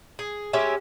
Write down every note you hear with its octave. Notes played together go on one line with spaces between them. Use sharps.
G#4
G#3 C#4 G4 E5